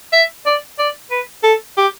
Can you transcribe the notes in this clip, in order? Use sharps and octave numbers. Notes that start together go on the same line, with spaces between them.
E5
D5
D5
B4
A4
G4